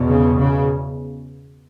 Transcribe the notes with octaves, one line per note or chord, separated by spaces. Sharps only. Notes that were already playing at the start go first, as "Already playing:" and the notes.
Already playing: E2 B2
C#3
C#3